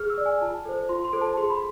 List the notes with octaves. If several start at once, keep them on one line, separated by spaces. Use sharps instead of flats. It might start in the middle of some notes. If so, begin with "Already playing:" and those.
Already playing: G#4 F6
E6
D5
G#5
F4 A5
A4 C5
F4 C6
C6
A4 C5
A5
G#4 C6
B5